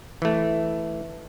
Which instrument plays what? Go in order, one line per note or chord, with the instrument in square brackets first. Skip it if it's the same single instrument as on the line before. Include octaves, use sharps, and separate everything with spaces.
[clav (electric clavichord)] E3 A3